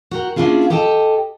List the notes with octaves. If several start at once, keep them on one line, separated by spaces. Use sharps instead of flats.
F#4 G4 A#4
A#3 C#4 D4 E4 F4 G#4
G4 A4 D#5 G5 A5